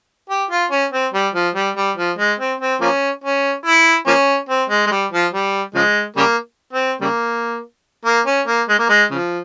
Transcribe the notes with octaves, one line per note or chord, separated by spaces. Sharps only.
G4
F4
C#4
C4
G3
F3
G3
G3
F3
G#3
C4
C4
F3 A#3 C#4
C#4
E4
F3 A#3 C#4
C4
G#3
G#3
G3
F3
G3
C#3 F3 G#3
C#3 G3 A#3
C4
C#3 G3 A#3
A#3
C#4
A#3
G#3
A#3
G#3
C#3 F3